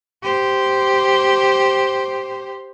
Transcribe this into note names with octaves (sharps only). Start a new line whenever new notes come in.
G4 C5